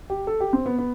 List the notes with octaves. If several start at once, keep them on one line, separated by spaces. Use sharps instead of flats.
G4
A4
G4
C4
B3
B3